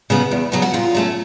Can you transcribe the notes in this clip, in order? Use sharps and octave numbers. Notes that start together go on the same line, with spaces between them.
C#3 F#3 B3
E2
C#3 F#3 B3
F#4
A#2 F4
F#3 A3 C#4